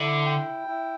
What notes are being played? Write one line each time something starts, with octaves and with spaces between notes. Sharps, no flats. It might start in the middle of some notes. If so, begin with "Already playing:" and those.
Already playing: D3 E4
G5
E4